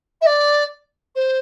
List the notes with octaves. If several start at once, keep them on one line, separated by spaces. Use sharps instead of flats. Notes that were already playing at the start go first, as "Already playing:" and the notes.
E5
D5
C5